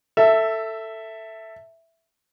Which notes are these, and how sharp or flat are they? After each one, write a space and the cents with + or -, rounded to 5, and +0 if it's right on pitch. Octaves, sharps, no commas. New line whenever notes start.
A4 +15 E5 +0